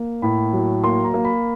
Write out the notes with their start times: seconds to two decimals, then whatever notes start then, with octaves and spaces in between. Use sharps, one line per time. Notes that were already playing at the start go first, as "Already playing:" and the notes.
Already playing: A#3
0.22 A2 B5
0.53 F#3
0.84 A#3 C6
1.04 A#5
1.14 A#3
1.25 B5